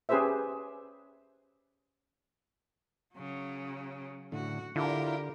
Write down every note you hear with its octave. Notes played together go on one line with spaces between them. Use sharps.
C#4 G4 G#4 B4 C5 E5
C#3 F#3
A2 D3 F#4
D3 E4 F4 G4 A#4